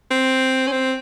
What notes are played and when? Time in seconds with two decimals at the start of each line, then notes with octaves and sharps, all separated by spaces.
0.11 C4
0.67 C#4
0.72 C4